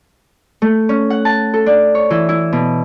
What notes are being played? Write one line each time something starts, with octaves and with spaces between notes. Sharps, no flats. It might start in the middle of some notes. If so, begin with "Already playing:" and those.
A3
C#4
F#5
A5
A4
D4
C#5
E3
E4
B2